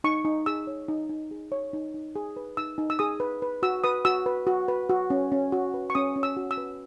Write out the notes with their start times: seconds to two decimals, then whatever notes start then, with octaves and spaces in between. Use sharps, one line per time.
0.04 D#4 C#6
0.25 D#4
0.46 G#4 E6
0.67 C#5
0.88 D#4
1.10 D#4
1.31 G#4
1.52 C#5
1.73 D#4
1.94 D#4
2.16 G#4
2.37 B4
2.57 D#4 E6
2.78 D#4
2.90 E6
2.99 G#4 D#6
3.20 B4
3.42 B4
3.63 F#4 E6
3.84 B4 D#6
4.05 F#4 E6
4.26 B4
4.47 F#4
4.68 B4
4.89 F#4
5.10 C#4
5.32 C#4
5.52 F#4
5.74 B4
5.90 C#6
5.95 C#4 D#6
6.16 C#4
6.23 E6
6.37 F#4
6.51 E6
6.57 B4